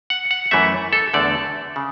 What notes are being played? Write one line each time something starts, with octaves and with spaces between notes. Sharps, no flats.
F#5
F#5
F#2 E3 A3 E5
A4
E2 D3 A3 D5
C#3